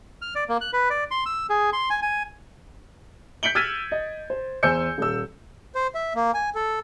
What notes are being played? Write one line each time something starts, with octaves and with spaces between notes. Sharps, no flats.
F6
D5
A#3
F#6
B4
D5
C6
E6
G#4
C6
G#5
G#5
G6 B6 C#7 D7 F#7 G7
E6 F6 G#6 A6 B6 D#7
D#5
C5
E2 C5 G#5 E6 G6 C#7
D#1 E6
C5
E5
A#3
G#5
A4